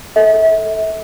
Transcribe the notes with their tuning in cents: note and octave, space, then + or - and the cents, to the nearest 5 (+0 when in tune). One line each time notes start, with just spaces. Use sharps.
A4 +0 E5 -35